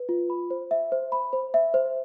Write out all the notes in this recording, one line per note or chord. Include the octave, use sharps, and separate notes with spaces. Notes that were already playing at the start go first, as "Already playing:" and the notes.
Already playing: B4
F4
B5
C5
E5
C5
B5
C5
E5
C5